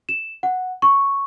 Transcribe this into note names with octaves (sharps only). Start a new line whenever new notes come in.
E7
F#5
C#6